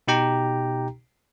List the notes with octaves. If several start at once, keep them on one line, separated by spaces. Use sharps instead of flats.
B2 D#4 G4 G5 A#5